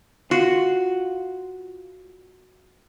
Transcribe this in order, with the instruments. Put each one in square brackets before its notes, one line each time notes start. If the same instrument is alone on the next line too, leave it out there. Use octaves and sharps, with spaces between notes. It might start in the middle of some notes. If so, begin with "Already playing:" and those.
[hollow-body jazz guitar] F4 [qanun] F#4